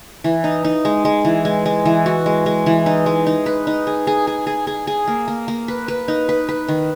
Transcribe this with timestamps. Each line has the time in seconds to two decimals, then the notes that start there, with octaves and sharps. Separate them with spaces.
0.24 E3
0.44 D#4
0.65 D#4
0.85 G#3
1.05 G#3
1.25 E3
1.45 G#3
1.66 G#3
1.85 E3
2.06 F#4
2.26 G#3
2.46 G#3
2.66 E3
2.86 D#4
3.06 G#3
3.27 D#4
3.46 B4
3.67 D#4
3.87 G#4
4.07 G#4
4.27 G#4
4.47 G#4
4.67 G#4
4.87 G#4
5.08 A#3
5.28 A#3
5.48 A#3
5.68 B4
5.88 B4
6.08 D#4
6.29 B4
6.49 B4
6.68 D#3